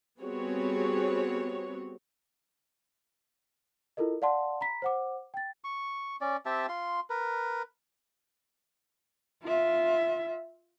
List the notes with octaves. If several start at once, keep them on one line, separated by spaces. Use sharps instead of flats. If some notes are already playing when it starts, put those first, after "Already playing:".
G3 B3 C4 F#4 G#4 C#5
E4 F4 A4 A#4 D#5
D5 F5 F#5 A5 C6
A#5 B5 B6
C5 F#5 D6
G5 A6
C#6
C#4 D5
C4 G4 E5 A5
F4 C6
A#4 B4
F4 E5